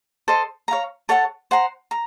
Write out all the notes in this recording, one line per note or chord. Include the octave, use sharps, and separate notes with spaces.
A4 C5 D#5
C#5 F5 A#5
A4 C#5 F#5 A5
C5 F#5 A#5
A#5